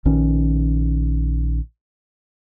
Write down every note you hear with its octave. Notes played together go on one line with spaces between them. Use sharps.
A#1 D#3 C#4